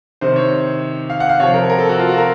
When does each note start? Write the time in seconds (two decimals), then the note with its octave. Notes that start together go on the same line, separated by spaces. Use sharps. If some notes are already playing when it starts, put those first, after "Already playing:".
0.21 C3 D#3 C5
0.36 C#5
1.10 F5
1.20 F#5
1.29 F5
1.40 C3 F3 C#5
1.54 A#4
1.70 A#4
1.79 A4
1.89 F#4
1.99 F4
2.09 F#4
2.18 A#4